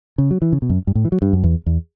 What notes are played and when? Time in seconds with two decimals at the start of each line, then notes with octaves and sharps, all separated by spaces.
0.18 C#3
0.31 F#3
0.42 E3
0.53 C#3
0.62 B2
0.70 F#2
0.87 G2
0.95 A2
1.05 E3
1.12 F#3
1.22 G2
1.33 F#2
1.44 E2
1.66 E2